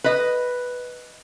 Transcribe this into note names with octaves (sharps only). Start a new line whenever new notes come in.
B4 D#5